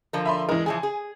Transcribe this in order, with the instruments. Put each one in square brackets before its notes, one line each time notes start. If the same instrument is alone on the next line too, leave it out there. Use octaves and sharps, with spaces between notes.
[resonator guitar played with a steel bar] D3 F3 A#4
[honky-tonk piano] E5 B5 C6
[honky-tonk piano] E3 A#4 [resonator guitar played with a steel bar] G#3
[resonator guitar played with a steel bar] E3 F3 G#4 [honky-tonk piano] G#5
[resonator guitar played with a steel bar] G#4